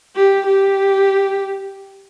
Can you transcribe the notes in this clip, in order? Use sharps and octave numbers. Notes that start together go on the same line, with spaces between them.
G4
G4